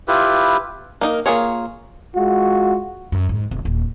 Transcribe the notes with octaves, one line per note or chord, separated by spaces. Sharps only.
E4 F4 G4 B4
A#3 D#4 A#4
A#3 C4 F4 G#4 C#5
G#3 F4 F#4
F#2
G#2
E1
D#1